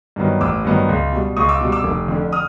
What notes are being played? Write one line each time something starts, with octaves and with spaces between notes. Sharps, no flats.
G2 D#3 F#3 B3
A1 D6 E6
G2 D#3 F#3 B3
C#2
B2 G3
C#2 C#6 D#6
D6 E6
B2 G3
D6 E6
F1
F2 D3
D#6 F6